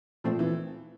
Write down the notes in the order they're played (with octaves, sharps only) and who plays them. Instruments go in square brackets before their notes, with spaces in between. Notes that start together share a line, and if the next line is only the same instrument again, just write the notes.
[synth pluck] A#2 A3 C4 [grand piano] F3
[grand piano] E3